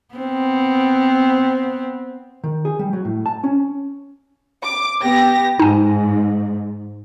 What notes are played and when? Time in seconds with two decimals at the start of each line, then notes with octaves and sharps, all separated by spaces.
0.15 B3 C4
2.44 D#3
2.65 G#4
2.79 G3
2.93 F#3
3.05 A2
3.26 A5
3.44 C#4
4.63 D6
5.02 B3 G4 A#6
5.59 G#2 D#4 G#5